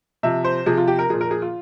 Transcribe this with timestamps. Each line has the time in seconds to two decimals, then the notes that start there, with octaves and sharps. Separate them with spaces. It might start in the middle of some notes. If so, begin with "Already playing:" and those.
0.23 C3 F3 E5
0.44 C5
0.66 C3 F3 G#4
0.77 F4
0.88 G4
0.99 A#4
1.09 A#2 F3 G#4
1.21 A#4
1.31 G#4
1.42 F4